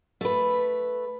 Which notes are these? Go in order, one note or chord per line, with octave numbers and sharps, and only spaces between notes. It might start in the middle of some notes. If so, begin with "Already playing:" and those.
A3 B4